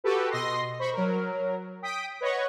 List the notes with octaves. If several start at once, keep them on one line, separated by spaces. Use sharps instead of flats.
F#4 G4 A4 B4
B2 D#5 C6 A#6 C7
C5 B5 C#6
F#3 A#4
G5 D#6 B6 D7
B4 C#5 D#5 F#5 B5 C#6